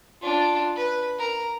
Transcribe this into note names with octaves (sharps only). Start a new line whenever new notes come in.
D4 F4
B4
A#4